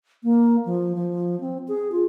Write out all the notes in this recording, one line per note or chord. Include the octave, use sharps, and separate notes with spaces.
A#3
F3
F3
C4
G#4
F4